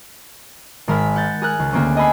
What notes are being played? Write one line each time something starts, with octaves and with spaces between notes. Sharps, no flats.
G#1 G#3 A#4 A5 B5 B6
F#5 G6 A6
G#4 A#4 F#6
C#2
D2 A#3 C4 C#4
D#5 G#5 A5 B5 E6 C7